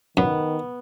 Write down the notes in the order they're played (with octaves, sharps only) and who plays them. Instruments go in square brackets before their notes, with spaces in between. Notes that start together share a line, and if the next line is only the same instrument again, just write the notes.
[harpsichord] F#2 [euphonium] D#3 [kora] B3